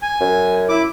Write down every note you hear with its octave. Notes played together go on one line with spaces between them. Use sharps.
G#5
F#2
E4 D6